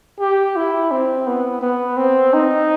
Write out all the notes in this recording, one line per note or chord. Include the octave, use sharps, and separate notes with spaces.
G4
E4
C4
B3
B3
C4
D#4